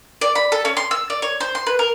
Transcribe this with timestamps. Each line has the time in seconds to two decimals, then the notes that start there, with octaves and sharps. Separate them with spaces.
0.21 D5
0.35 B5
0.52 A4
0.65 C#4
0.77 C6
0.91 E6
1.10 D5
1.22 C#5
1.40 C5
1.55 C6
1.67 B4
1.79 A#4